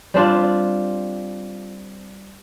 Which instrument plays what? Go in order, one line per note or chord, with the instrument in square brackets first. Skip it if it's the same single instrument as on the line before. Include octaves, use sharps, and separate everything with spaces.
[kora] G3 C4 D4 F4